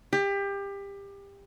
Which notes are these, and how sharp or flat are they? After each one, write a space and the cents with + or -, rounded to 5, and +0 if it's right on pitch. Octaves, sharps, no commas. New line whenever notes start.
G4 +25